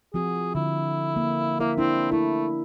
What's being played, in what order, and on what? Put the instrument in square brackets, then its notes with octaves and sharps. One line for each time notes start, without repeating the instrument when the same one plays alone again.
[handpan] F3 C4 F#4 [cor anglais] G#4
[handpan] D3 [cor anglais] E4
[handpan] A#3
[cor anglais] A#3 [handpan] E4 A#4 E5
[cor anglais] C4 [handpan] D4 E4
[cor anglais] A3 [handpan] E4